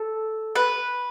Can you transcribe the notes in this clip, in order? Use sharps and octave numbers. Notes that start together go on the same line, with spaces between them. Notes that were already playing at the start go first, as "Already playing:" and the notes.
Already playing: A4
B4